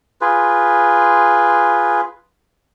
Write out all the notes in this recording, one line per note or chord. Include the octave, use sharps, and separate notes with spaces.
F4 G#4 B4